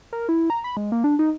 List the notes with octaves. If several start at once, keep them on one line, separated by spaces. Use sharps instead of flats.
A#4
E4
A#5
B5
G#3
A#3
D4
D#4